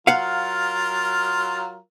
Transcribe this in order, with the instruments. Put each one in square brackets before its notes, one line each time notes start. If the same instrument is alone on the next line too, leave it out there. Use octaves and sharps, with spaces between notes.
[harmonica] F#3 F4 A#4 [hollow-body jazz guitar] F5 F#5